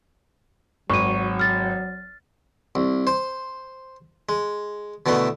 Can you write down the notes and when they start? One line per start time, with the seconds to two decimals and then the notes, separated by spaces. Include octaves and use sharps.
0.90 G#1 F#3 C#6 D#7
1.39 F6 A6
2.75 C2
3.07 C5
4.29 G#3
5.06 B2 D3 E3 A3 B3